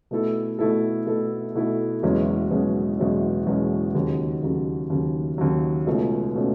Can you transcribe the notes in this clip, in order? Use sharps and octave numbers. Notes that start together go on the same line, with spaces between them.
B2 A3 E4 A4
B2 A3 E4 A4
B2 A3 E4 A4
B2 A3 E4 A4
F#1 E2 B2 G#3 C#4
F#1 E2 B2 G#3 C#4
F#1 E2 B2 G#3 C#4
F#1 E2 B2 G#3 C#4
D#2 C#3 F#3
D#2 C#3 F#3
D#2 C#3 F#3
D#2 C#3 F#3
C#2 B2 A3 C#4
B2 A3 C#4